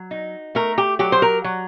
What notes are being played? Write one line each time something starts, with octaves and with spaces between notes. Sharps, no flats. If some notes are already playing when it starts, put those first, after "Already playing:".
Already playing: F#3
D#4
A3 A#4
G4
F#3 G4
C5
A#4
F#3